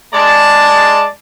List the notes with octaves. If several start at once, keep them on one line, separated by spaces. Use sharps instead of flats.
G#3 D5 A5